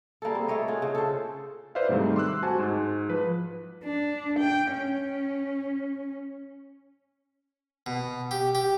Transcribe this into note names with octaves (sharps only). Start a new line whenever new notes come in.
G3 A#3 G#4 A4
C4
A3 A4 C#5 D#5
F4 G#4 F#5
C#3
A4 C5
B4 C5 D5 E5 F5
G#2 C3 D#3 G3 A3
C6 D6 E6 F#6
F#4 C5 G#5 A5
G#2
F3 B4
D4
G5
C#4
B2
G4
G4